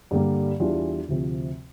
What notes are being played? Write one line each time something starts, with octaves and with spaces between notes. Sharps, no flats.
G2 D3 G3 A#3
E2 E3 G3 D4 F4
D2 C3 F3 C4